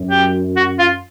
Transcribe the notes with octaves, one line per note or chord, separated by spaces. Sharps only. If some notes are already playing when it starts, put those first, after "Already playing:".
Already playing: F#2
G4
F#4
F4